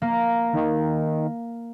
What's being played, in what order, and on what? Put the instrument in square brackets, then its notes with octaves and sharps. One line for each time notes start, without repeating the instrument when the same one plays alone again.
[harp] A#3
[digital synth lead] D#3